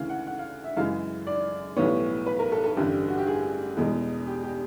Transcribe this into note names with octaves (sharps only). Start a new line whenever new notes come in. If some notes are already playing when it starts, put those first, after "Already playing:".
Already playing: D2 C#3 E3 F5
F#5
F#5
F5
E5
F#2 C#3 E3 G#3 F5
D5
B1 A2 E3 G3 B3 C#5
B4
A#4
A4
A4
A1 G2 D3 G4
F#4
G4
G#4
E2 B2 G#3
G4
G4